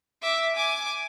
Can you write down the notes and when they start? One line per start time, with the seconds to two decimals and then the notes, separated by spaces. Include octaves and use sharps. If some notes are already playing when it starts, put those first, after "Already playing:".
0.22 E5 D6
0.56 G#5 D6